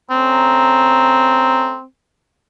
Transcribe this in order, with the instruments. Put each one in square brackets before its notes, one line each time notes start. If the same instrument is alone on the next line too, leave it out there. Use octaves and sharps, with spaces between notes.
[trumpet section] A3 C#4 A#5 [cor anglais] C4